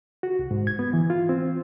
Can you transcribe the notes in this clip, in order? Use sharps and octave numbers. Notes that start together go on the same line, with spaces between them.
F#4
C2
G#2
G#6
B3
E3
F4
C4